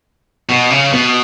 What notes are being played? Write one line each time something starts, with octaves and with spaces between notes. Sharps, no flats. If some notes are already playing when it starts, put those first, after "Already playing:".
B2
C#3
B2